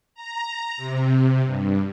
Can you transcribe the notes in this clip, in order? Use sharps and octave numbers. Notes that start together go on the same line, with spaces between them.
A#5
C3
G2